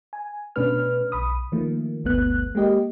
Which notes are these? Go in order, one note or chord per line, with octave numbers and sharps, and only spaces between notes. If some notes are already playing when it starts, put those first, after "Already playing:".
G#5
B2 A3 C#4 D4 B4 F6
B1 B5 D#6
D#3 F3 A3 A#3
G1 D2 A3 B3 F#6
G#3 A#3 G4 D#5